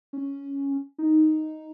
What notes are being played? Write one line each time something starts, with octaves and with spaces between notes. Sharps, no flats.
C#4
D#4